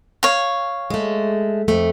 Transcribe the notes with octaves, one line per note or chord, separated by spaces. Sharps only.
C#5 F5
G#3 A3
F2 A3